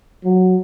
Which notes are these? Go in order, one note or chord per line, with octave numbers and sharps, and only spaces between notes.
F#3